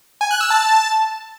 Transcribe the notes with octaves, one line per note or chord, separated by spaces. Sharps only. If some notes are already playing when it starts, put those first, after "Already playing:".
G#5
F#6
E6
A5